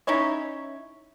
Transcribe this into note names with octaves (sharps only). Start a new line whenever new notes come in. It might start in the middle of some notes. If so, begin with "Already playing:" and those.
C#4 D#4 E4 C#5